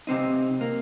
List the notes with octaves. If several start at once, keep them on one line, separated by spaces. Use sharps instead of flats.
C3 C4 D#4
A#3